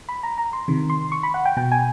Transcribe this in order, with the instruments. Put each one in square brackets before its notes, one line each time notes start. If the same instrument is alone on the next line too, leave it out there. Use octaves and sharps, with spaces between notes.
[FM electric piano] B5
A#5
A#5
C6
C3 D#3
C6
C#6
B5
F#5
G5
B2 G5
G#5